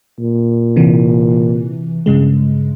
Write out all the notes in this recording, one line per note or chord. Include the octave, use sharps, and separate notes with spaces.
A#2
C3 E3
G2 C#3 G#3